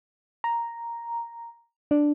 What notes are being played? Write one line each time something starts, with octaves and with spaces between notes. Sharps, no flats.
A#5
D4